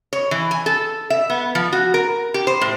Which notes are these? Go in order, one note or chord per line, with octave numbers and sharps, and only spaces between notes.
C#5
E3
G#5
A4
E5
B3
F3
F#4
A#4
G4
C5
A2